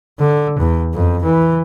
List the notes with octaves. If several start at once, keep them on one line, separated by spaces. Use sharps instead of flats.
D3
E2
F2
E3